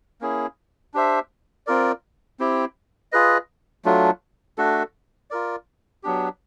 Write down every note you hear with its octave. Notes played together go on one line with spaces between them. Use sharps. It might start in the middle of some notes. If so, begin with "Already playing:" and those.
A#3 C#4 E4 G#4
D4 G4 C5 E5
C4 F4 A#4 D5
C4 E4 G4
F4 G#4 B4 D#5
F#3 A3 D4 F4
A3 D4 F#4 A4
F4 A#4 D5
F#3 B3 D4 G4